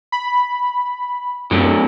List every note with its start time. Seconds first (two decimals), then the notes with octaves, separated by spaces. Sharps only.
0.12 B5
1.51 F#2 A2 F#3